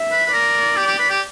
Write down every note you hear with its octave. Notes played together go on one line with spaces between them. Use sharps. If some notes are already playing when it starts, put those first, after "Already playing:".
Already playing: E5
B4
B4
A#4 D5
G4
G4
B4
G4